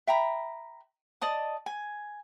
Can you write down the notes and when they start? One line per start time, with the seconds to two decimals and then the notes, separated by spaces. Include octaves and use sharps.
0.07 E5 G5 A#5 B5
1.21 D5 D#5 A5 D#6
1.66 G#5